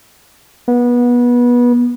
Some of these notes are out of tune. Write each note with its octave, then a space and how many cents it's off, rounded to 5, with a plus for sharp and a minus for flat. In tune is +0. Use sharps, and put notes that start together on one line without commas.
B3 -25